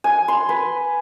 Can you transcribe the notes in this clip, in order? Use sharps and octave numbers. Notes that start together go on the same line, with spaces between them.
G#5
C6
B4